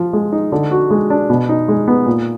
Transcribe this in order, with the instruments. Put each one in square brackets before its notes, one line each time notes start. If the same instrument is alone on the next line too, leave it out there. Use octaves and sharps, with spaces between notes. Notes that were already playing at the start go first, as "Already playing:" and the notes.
Already playing: [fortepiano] F3
G#3
D#4
D3
F#4
G#3
D4
B2
D#4
G#3
B3
A#2